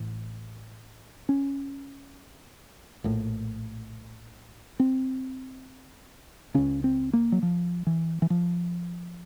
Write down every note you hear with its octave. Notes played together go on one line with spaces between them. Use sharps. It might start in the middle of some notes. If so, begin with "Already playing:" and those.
Already playing: A1 A2
C#4
A#1 A2
C4
C#2 C#3 C#4
C4
A#3
F#3
F3
E3
E3
F3